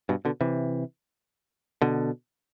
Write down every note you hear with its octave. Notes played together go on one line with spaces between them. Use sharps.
G2 B2
B2 D3
C3 E3
B2 D3